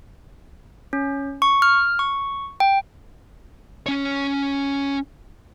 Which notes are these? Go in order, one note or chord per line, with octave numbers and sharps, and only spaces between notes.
C#4
C#6
F6
C#6
G5
C#4 C#5